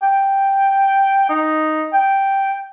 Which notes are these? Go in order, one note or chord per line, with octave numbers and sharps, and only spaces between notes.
G5
D#4
G5